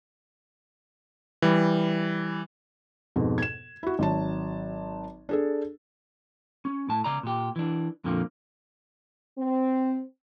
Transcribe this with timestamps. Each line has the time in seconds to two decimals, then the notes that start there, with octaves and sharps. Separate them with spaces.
1.42 E3 G3
3.16 F2 G#2 B2
3.38 G#6 E7
3.83 E4 F#4
3.99 G#1 F#3 A5
5.29 D4 G#4 A4
6.65 C#4
6.89 A2 A5
7.04 C#3 D5 A#5
7.23 A#2 G4
7.56 E3 D4
8.04 F2 A#2 D3 F3 A#3
9.37 C4